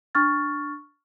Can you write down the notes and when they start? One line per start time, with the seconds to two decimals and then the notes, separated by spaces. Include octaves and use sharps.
0.15 D4 C#6 F6 A6